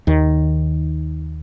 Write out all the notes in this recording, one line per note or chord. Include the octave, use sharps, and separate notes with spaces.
D#2 D#3